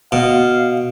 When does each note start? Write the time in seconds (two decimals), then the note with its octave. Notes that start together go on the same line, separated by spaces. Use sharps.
0.12 B2 F5